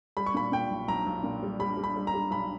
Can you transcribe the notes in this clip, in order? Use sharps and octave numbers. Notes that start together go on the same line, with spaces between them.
G3 B5
C#6
A#2 B5
A#2 G5
B1
B1 A#5
B1
A#2
G3
G3 B5
G3
B5
G3
A#5
G3
B1 B5